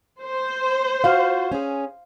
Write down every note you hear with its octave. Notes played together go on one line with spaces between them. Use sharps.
C5
F4 F#4 F5
C#4 G#4